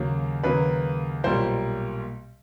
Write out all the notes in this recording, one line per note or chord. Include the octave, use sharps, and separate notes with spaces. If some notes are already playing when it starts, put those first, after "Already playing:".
Already playing: D#2 C#3 F#3 A#3
D#2 C#3 F#3 A#3 B4
B1 A#2 G3 A#3 C5